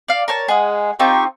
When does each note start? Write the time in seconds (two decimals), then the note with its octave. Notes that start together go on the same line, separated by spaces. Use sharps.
0.08 D5 F5
0.28 A#4 C#5 A5
0.48 G#3 G#4 F#5
0.99 C4 D#4 F4 G4 C#6